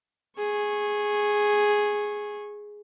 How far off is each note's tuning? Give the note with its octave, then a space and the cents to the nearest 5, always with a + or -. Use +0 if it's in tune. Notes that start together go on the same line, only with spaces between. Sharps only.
G#4 +0 C#6 -20